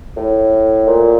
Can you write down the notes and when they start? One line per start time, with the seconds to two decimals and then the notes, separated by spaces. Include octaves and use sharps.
0.17 A2
0.87 A#2